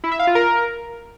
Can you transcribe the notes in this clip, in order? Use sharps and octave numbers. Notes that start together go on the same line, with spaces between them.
E4
E5
F5
F4
A#4